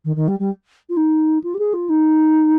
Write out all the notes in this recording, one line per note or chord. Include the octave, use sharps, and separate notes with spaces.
D#3
D#3
G3
G3
F4
D#4
F4
G4
G#4
F4
D#4